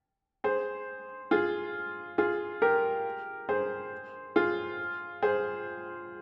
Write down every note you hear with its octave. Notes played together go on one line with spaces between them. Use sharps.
G#4 C5
F4 G#4
F4 G#4
G4 A#4
G#4 C5
F4 G#4
G#4 C5